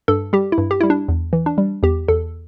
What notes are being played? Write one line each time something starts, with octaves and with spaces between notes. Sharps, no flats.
G2 A4
G3 G4
E4
G2
G4
G3 E4
D4
E2
E3
D4
G3
E2 G4
E2 A4